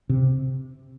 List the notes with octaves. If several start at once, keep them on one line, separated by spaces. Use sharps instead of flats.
C3